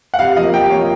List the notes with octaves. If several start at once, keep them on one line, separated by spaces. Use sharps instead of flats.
F#5
C3 F5
F3 A#3 D#5
C3 G5
F3 A#3 C#5